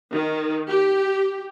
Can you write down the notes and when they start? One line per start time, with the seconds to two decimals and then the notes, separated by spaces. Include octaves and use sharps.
0.12 D#3
0.68 G4